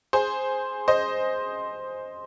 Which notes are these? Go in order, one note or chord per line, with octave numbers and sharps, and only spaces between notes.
G#4 C5
C5 D#5